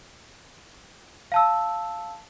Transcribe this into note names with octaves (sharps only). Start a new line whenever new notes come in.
F5 A5 E6